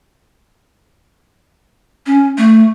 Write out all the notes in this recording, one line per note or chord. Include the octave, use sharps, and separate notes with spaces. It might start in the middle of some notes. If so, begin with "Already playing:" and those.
C#4
A3